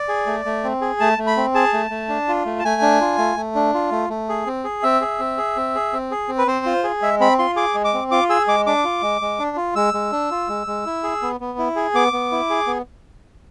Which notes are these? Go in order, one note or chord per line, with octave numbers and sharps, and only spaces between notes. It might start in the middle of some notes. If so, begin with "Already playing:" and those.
Already playing: D5
G#4
A3
A3
C4
G#4
A3 A5
A3
B5
C4
G#4 A5
A3
A3
D4
F4
A3
A5
A3 G#5
D4
F4
A3
A3
D4
F4
A3
A3
G#4
C4
G#4
C4 E5
G#4
C4
G#4
C4
G#4
C4
G#4
C4
B4
C4 C5
F4
G#4
G#3 E5
C4 B5
F4 C6
G#4 D6
G#3
D6
C4
F4 D6
G#4 E6
G#3 D6
D4 D6
F4
G#3
G#3
D4
F4
G#3 E6
G#3
D4
F4
G#3
G#3
E4
G#4
B3
B3
E4
G#4
B3 D6
B3
E4
G#4
B3